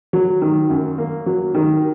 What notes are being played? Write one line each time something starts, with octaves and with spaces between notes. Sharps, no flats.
F#3
D#3
F#2
A#3
F#3
D#3